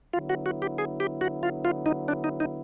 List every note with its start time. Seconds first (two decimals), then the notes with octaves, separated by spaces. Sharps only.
0.13 D3 F#3 B3 E4 F4
0.30 F#4
0.46 F#4
0.62 G4
0.78 G#4
1.00 G4
1.21 F#4
1.43 F4
1.65 F4
1.86 D#4
2.08 D4
2.24 D#4
2.40 D#4